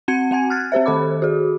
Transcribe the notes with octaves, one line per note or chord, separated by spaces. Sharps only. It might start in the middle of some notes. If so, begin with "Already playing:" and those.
C4 F#5 G#6 C#7
C4 F#5 G#5 G#6
F6 F#6 G#6 A6
C4 G4 C5 E5
D#3 A4 B5 D6
F#4 G#4